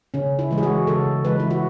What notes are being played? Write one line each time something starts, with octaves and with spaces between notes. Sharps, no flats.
C#3 C#4
E4
E3 G#3
G#4
F#4
C#3 A4
E3 G#3 B4
E4
F#4